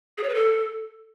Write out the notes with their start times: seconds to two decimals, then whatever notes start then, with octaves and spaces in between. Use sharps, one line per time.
0.18 G#4
0.23 C#5
0.29 B4
0.35 A4